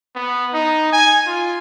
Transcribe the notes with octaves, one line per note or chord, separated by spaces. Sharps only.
B3
D#4
G#5
F4